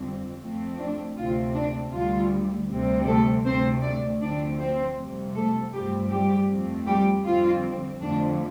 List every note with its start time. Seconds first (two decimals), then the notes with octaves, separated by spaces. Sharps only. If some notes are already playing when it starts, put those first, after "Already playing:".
Already playing: F2 D3 G3 C4
0.40 F2 F3 A3 C4
0.79 D4
1.17 D2 C3 A3 C4 F4
1.54 D4
1.93 D2 D3 G3 F4
2.69 D2 C3 G3 C4
3.07 A3 A4
3.44 D2 C3 A3 C4 C5
3.82 D4 D5
4.21 D2 D3 F3 A3 C4 D4 D5
4.59 C4 C5
4.97 F2 C3 G3
5.35 A3 A4
5.72 G2 F3 G3 A3 C4 G4
6.11 G3 G4
6.49 F2 F3 A3 C4
6.86 G3 G4
7.25 F2 D3 G3 C4 F4
8.01 F2 D3 F3 A3 D4